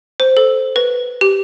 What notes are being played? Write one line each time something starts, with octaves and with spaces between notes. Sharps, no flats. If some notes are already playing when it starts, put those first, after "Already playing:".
C5
A4
B4
G4